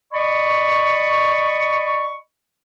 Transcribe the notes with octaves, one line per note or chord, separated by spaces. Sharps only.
D5 D#5 B5 C#6